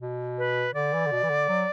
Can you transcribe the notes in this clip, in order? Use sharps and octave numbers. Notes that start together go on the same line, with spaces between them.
B2
B4
D3 D5
E3
D3
B2
E3
D3
F#3